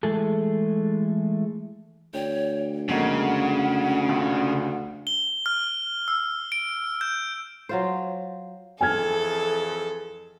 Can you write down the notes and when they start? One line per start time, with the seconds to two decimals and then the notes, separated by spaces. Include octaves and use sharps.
0.03 E3 G#3 A3 G#4 A4
2.14 D2 C#5 G5
2.89 F2 C#3 G#3 A#3 F#5
4.08 F1 C#2
5.07 G7
5.46 F6
6.08 E6
6.52 D7
7.01 G6
7.69 F#3 F4 C5
8.81 F2 E3 G#4 A4 G#5 F6 G#6